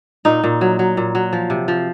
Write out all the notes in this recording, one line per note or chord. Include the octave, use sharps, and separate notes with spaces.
A#2 D#4
A#2
F#3
F#3
A#2
F#3
F3
C3
F3